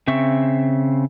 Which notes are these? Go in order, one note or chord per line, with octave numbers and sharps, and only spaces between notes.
C#3 C4 E5 C#6